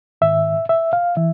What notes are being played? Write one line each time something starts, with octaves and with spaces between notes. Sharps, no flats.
G#2 D#3 E5
E5
F5
E3 E5